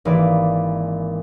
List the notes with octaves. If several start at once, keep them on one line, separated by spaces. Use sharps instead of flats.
G#1 E3 A#3 D5